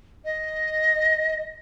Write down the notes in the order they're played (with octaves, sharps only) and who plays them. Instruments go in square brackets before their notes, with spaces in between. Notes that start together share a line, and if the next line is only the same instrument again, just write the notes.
[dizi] D#5